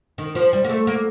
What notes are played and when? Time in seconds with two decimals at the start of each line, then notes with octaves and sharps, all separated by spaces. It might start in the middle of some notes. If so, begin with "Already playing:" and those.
0.18 D#3
0.35 F3
0.53 G3
0.64 A#3
0.69 A3
0.87 A#3